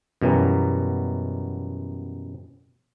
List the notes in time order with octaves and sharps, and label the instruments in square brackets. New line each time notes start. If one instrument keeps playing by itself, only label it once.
[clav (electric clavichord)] F#2 B2 E3 F#3 G3